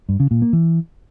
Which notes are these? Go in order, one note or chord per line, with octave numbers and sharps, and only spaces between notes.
G2
C#3
A#2
A#3
E3